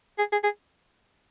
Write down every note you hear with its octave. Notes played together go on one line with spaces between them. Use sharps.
G#4
G#4
G#4